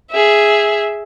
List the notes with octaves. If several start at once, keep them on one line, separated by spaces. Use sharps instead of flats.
G#4 E5